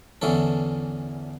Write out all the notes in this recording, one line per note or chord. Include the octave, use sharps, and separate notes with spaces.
E2 D3 E3 C#4 A4